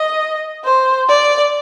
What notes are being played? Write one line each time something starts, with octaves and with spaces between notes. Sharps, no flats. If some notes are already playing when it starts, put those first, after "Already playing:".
Already playing: D#5
C5
D5